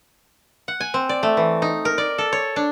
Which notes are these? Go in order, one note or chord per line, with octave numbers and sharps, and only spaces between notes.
F#5
G#5
C4
D5
A3
E3
D#4
A#4
D5
A4
C#5
D4